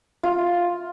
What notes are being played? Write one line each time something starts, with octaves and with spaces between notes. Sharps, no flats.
F4